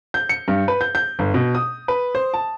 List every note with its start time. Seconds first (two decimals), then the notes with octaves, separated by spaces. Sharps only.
0.14 G6
0.29 C#7
0.48 G2
0.68 B4
0.81 G6
0.95 G6
1.19 G1
1.34 B2
1.55 D#6
1.88 B4
2.15 C5
2.34 A5